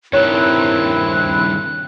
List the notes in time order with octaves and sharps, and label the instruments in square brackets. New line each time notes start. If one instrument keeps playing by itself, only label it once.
[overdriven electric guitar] G2 D#3 [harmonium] C4 E4 [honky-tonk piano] C#5 [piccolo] F#6